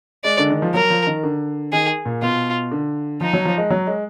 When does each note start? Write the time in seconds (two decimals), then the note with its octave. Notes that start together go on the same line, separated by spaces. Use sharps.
0.24 G#3 D5
0.38 D3
0.50 D#3
0.62 F3
0.74 F#3 A#4
0.90 F3
1.07 D#3
1.23 D3
1.72 D#3 G#4
2.05 A#2
2.22 B2 F4
2.71 D3
3.21 F3 D#4
3.33 F#3
3.45 F3
3.58 G#3
3.70 F#3
3.87 G#3